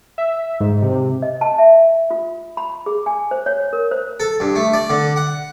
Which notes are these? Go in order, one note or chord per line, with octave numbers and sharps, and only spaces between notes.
E5
G#2
C3
D#5
A5
E5
F4
B5
G#4
G#5
C5
C#5
A#4
C5
A4
G2
A3
D5
D3
F#5